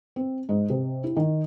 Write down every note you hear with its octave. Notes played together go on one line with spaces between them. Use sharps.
C4
G#2
C3
E4
D#3